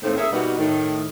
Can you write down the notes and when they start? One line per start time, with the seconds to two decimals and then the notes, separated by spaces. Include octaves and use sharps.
0.03 A2 D#3 G#3 A#3 C4
0.17 A#3 C#4 G#4 E5
0.32 B2 G3 A#3 B3 D#4 F#4
0.59 A2 D#3